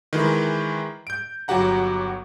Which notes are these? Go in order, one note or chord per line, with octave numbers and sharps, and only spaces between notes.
D#3 E3 G#3
G6 D7
G1 F#3 F#4 G4 F#5 A#5